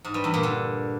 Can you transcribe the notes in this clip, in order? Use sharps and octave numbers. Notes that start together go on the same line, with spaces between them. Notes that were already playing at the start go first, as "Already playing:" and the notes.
G#2
G2
E2
A#2
D3